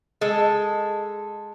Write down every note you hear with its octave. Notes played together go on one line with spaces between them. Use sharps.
G#3 A4